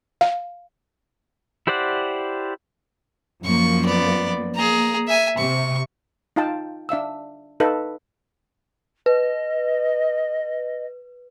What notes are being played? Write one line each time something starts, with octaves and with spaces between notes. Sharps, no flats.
F5
E4 G4 C5 D5 F#5
F#2 F3 A#3 C#6
B3 D5
A#3 G#4 A#5
E5 G#5
C3 C#6
D#4 F4 F5 G5 A5
D4 E5 F5 E6
D#4 A4 B4 D#5 F5
B4 D#5